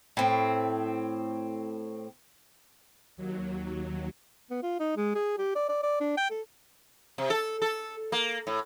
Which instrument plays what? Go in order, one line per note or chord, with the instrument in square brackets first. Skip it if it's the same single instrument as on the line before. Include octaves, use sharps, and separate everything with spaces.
[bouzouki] A2 C4
[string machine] D#2 F#3
[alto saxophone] B3
F4
D#4
G#3
G#4
G4
D5
D5
D5
D4
G5
A4
[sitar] C3
A4
A4
A#3
A2